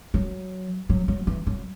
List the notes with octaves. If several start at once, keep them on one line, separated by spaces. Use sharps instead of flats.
F#3
F#3
F#3
E3
F#3